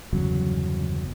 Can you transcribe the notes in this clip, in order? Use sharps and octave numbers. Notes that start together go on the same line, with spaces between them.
G1 E2 C#3 F#3